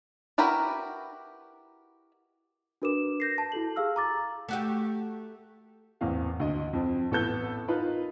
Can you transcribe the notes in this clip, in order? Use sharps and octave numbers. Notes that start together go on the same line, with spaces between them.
E4 F#4 G4 A#4 B4
D4 F#4 A#4 B4 D6 E7
G6 A#6 C7
A5
E4 F#4 A4 F#7
G4 G#4 F5 E6 F6
A#5 D6 A6
A3 F#4 G4
A1 E2 A#3 C4 F5
D2 D#5
F2 C4
A1 B3 A4 B4 G6
D#4 F4 A#4 B4